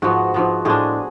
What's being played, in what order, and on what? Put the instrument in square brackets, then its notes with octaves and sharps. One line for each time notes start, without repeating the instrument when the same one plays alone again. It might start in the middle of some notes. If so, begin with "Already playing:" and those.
[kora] G#2 F3 B3 [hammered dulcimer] F#4
[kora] G#2 F3 B3
[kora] A2 G#3 D4 [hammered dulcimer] G#4